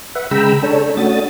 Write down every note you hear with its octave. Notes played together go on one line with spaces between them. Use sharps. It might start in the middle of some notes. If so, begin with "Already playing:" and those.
B4 E5 F#5
C#3 G#3 G5 A#5 B5 E6
D4 A4 C#5
A3 C#4 D4 F#4 D#6 A6